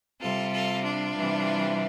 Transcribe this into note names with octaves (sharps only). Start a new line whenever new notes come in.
C3 G3 F4 A4
F4 A4
D4 F4
C3 E3 G3